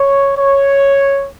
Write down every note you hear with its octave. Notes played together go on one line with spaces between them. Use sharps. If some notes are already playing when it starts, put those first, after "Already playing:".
Already playing: C#5
C#5